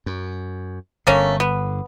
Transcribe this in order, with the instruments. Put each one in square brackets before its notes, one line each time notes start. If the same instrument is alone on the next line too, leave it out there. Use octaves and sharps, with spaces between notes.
[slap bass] F#2
[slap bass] G1 D3 [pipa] A3 A#3 C#4
[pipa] B3